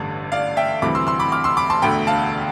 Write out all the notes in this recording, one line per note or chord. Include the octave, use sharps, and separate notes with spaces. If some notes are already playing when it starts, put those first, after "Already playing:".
Already playing: A1 G2 D3
D5 F5
E5 G5
D2 C3 E3 G3 B5 D6
C6 E6
C6 E6
B5 D6
D6 F6
C6 E6
B5 D6
A5 C6
E1 D2 D3 A3 G5 B5
F5 A5